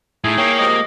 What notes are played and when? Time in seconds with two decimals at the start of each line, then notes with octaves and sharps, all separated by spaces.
0.24 A2 D#4 E4 G#4
0.38 A#3 C#5 G5
0.59 C3 F3 G#3 D#5